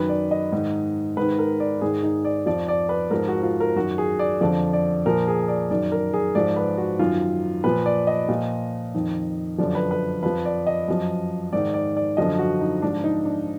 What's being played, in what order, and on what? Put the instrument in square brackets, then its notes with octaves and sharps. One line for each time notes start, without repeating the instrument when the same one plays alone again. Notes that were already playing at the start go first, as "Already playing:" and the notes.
Already playing: [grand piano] F#2 D#3 B4
D5
D#5
G#2 D#3
G#2 D#3 B4
A#4
D5
G#2 D#3 G#4
D#4
D5
F2 F3 D5
D5
B4
G#2 F3 A#4
F#4
F4
A#4
F#2 D#3 F#4
G#4
D5
F2 D3 F3 D5
D5
A#2 F3 A#4
G#4
D5
F#2 D#3 D5
A#4
G#4
G#2 F3 D5
B4
F#4
F#2 D#3 F4
A#2 F3 B4
D5
D#5
A#2 F3
F2 D#3
F#2 D3 F3 D5
B4
B4
F2 F3 B4
D5
D#5
F#2 F3
G#2 D#3 D5
D5
D5
F#2 D3 F3 D#5
F#4
D#4
G#2 F3 D4
D#4
D4